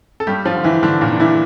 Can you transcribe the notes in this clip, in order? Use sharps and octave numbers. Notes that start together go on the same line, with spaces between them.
A4
G2 G3 G4
F3 F4
D3
E3 E4
G2 D3 D4
A#2 A#3
D3 D4
E3 E4